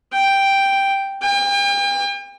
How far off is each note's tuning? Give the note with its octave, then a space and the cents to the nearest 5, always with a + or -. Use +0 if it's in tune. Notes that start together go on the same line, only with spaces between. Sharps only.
G5 +0
G5 +40